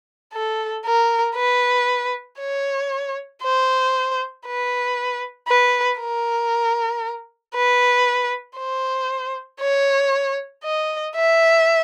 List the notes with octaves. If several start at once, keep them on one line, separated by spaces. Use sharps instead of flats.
A4
A#4
B4
C#5
C5
B4
B4
A#4
B4
C5
C#5
D#5
E5